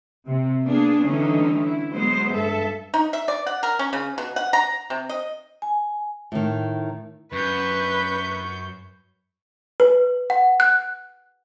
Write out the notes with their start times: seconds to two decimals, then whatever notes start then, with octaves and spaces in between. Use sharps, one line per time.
0.27 C3
0.63 A#3 B3 D4 G#4
1.05 D3 E3 G3 A3 C#4 D#4
1.62 E4
1.94 F#3 G#3 B3 C5
2.31 G2 A4 E5
2.94 D#4
3.13 E5
3.28 D5
3.46 F#5
3.63 A#4
3.79 C#4
3.93 C#3
4.18 B2
4.36 F#5
4.53 A#5
4.90 C3
5.09 D#5
5.62 G#5
6.32 A2 D#3
7.32 F#2 B4 C#6 G6
9.80 B4
10.30 F#5
10.60 F#6